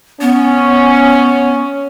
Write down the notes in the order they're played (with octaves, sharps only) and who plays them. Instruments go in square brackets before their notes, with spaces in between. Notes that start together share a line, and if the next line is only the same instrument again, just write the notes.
[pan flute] B3 [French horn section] C#4